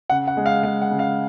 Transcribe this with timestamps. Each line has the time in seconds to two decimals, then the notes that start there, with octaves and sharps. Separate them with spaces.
0.10 C#3 F#5
0.28 F#5
0.37 G#3
0.46 F5
0.63 G#3 F5
0.82 F#5
0.91 C#3
0.99 F5